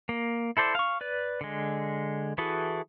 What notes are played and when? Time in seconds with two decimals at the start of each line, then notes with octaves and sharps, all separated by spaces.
0.09 A#3
0.57 E4 A4 C5 D5
0.75 F5 C#6
1.01 B4 D5
1.41 D3 G#3
2.38 E3 E4 F#4 G#4 A4